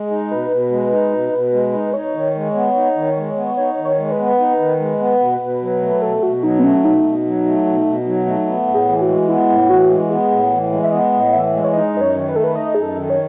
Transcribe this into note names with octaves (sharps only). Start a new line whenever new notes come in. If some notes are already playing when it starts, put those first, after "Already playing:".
Already playing: G#3 G#4
D#4
B2 B4
B2
G#3
D#4
B2
B2
G#3
D#4
D#4 C#5
D#3
G#3
B3
D#4
D#3
G#3
B3
D#4 C#5
D#3
C#5
G#3
B4
B3
D#4
D#3
G#3
B3
B2
B2
F#3
A3
B2 A4
B2 F#4
F#3 D#4
B3
A3 C#4
B2 D#4
B2
F#3
A3
B2
B2
F#3
A3
B3
A2
G#4
E3
F#4
G#3
B3 E4
A2
E3 F#4
G#3
B3 G#4
A2
E3
G#3
E5
B3 D#5
A2
E3 E5
G#3
C#5
D#4 D#5
F#2 B4
C#5
D#3
B4
A3 A4
B4
D#4 D#5
F#2 G#4
A4
D#3
C#5